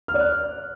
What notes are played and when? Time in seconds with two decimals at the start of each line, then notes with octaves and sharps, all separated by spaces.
0.08 F6
0.14 D5
0.20 F#6